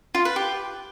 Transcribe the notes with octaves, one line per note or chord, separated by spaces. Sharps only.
F4
B4
G4